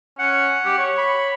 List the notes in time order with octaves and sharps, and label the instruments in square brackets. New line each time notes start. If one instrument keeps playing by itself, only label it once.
[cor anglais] C#4 [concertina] F#5
[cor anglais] G4
C#5
[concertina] B5